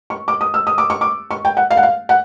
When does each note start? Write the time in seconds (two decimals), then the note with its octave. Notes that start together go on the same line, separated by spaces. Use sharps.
0.10 C#6
0.28 D6
0.41 D#6
0.54 E6
0.67 D#6
0.78 D6
0.90 C#6
1.01 D6
1.31 C#6
1.45 G5
1.57 F#5
1.70 F5
1.77 F#5
1.83 F5
2.09 F#5